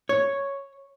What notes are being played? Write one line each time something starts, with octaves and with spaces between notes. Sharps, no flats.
C#5